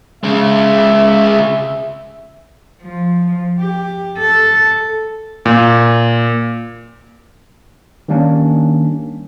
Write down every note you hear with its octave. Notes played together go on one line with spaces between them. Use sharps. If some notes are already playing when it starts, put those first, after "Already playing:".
C#3 G#3 E5
F3
G4
A4
A#2
D#3 G3 A#3 C#4 D4